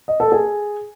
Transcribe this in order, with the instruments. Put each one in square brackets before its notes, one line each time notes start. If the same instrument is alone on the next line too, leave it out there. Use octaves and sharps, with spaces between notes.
[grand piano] D#5
A4
G#4